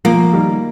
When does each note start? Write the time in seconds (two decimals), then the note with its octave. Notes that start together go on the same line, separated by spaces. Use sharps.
0.05 F3 A#3
0.33 D#3 G3